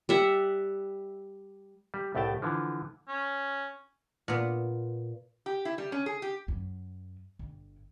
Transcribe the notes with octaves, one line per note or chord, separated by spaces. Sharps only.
G3 E5 F#5
G3
C2 A2 A3 G5 A5
D3 E3 F3
C#4
A#2 B3
G4
E4
G3
C#4
G#4
G4
F#2
G1